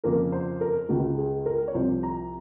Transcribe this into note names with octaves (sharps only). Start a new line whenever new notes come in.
F2 C#3 F3 A#3 A#4
C5
A#4
C#2 C#3 G#3 F#4
G#4
A#4
C#5
C2 C3 F3 C5
A#5